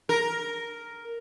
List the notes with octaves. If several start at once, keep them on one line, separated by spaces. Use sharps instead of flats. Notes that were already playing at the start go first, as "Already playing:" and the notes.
A#4